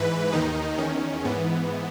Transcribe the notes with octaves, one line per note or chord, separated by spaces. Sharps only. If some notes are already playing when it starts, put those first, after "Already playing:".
Already playing: G#2 E3 B4
D#2 D#3 D#4
E2 D#3 C#4
G#2 E3 B3